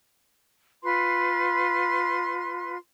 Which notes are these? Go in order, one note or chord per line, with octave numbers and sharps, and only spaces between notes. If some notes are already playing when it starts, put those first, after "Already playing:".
F4 B4 C6